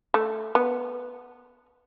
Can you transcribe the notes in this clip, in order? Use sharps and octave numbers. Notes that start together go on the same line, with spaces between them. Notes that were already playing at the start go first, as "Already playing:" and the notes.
A3
B3